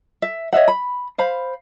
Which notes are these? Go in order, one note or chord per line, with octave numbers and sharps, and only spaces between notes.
E5
C#5 D#5 E5 F#5
B5
C5 F5 B5